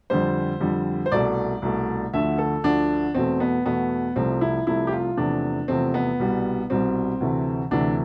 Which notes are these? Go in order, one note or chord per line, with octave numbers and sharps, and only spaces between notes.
F2 D3 G3 C5
F2 D3 G3
C5
C2 B2 A3 D5
C2 B2 A3
D2 D3 F3 A3 E5
A4
D2 D3 F3 A3 D4
E2 B2 A3 C4
B3
E2 B2 A3 B3
C2 C3 F3 A3 C4
E4
C2 C3 F3 A3 E4
G4
F4
E2 C3 F3 A3 D4
E2 C3 F3 A3 C4
B3
C2 B2 G3
C2 B2 G3 C4
D2 C3 E3 A3
D2 C3 E3 A3 D4